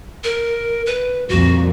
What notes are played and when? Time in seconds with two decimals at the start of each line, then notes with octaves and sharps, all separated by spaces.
0.24 A#4
0.86 B4
1.29 C2 F2 A#2 F#4